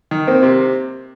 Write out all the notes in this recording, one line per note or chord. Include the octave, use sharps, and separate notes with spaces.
D#3
A#3 C4
C3